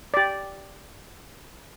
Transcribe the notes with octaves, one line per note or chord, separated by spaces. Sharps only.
G4 D5